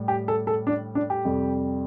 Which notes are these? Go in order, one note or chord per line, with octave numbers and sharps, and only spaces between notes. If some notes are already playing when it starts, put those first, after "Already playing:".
Already playing: A2 G3
G4
A4
A4
D4
D4
G4
F2 C3 G3